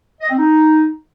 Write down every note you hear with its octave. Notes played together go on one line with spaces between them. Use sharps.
D#5
C4
D#4